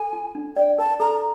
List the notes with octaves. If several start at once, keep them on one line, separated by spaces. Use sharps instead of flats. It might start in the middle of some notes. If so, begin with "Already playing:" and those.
Already playing: A4 G#5
F4
D4
D5 G5
A#4 A5
A4 A#5